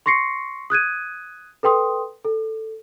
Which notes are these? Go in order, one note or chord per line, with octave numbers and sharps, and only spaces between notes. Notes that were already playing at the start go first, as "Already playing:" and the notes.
C6 C#6 A#6 C7 C#7
D#6 F#6 G#6 D#7
A4 B4 G5 C6 D#6
A4